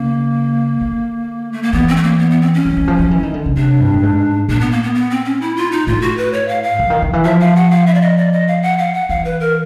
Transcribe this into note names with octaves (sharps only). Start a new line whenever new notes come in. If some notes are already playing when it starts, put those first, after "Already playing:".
Already playing: C#3 A#3
D3
A3
A#3
E3 B3
C4
A3
A#3
B3
B3
C4
C#4
E3
E3
F3
F3
E3
D#3
D3
C#3
C3 D4
G2
A2
G#2
A#2 D4
B3
A#3
B3
B3
C4
C#4
E4
F4
D#4
A2 F4
F#4
B4
C#5
F5
F5
D3
D#3
D#3
E3
F3 E5
F5
F#5
F5
E5
D5
D#5
D5
D#5
F5
F#5
F5
F#5
E3 F5
B4
A#4